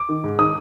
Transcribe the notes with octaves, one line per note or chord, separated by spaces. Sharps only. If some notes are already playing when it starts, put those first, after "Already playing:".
Already playing: D6
D#3
G#2
D#3 D#6